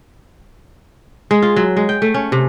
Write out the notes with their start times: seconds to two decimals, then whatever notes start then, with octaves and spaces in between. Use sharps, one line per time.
1.31 G#3
1.42 F4
1.56 F#3
1.77 G#3
1.89 G5
2.02 A3
2.14 C#4
2.32 C3